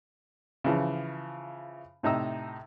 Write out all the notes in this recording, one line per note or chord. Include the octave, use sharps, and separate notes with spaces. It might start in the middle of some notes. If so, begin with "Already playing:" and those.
C#3 E3 F3
A2 C3 D#4 A#5 E6